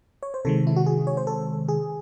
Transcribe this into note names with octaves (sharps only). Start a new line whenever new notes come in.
C#5
C5
C3 D#3 G#3 A4
E4
F#4
G#4
C#5
C5
A4
G#4